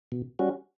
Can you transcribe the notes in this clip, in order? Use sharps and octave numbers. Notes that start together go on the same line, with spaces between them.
B2
G3 C#4 F#4